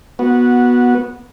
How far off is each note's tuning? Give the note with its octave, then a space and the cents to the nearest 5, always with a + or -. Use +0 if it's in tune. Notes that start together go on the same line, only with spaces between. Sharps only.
B3 -15 F#4 -5